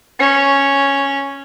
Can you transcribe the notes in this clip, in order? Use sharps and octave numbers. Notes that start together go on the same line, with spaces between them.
C#4